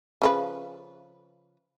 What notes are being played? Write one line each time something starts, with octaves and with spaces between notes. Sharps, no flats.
C#3 F3 B4